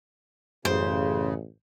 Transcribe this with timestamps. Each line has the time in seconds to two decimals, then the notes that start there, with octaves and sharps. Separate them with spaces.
0.65 A1 F#2 C#3 C5